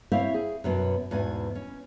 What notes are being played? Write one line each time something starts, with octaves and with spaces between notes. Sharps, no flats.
C4 E4 C5 C#5 E5 F5
G#4
F#2 B2 F#3
E2 G#2 B2 G#5
C#4